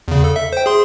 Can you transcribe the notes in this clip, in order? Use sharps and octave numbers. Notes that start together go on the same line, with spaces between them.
E2 C#3
A4
E5
C5 G5
G#4 C6